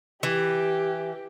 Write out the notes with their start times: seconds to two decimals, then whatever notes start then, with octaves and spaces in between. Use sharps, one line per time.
0.23 E3 G4